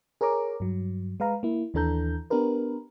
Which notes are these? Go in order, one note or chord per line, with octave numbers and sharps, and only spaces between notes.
G#4 A#4 C#5 A#5 D6
G2 F#3
G#3 B4 F5 A#5
A#3 E4
D#2 E3 D4 A4 A#5 G6
B3 D4 G4 A#4 B4